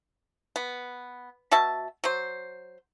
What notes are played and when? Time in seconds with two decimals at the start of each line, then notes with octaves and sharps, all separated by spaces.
0.56 B3
1.51 B2 F#4 E5 A5
2.04 F#3 C5